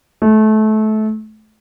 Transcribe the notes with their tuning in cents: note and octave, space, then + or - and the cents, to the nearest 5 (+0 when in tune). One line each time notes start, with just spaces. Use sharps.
A3 -25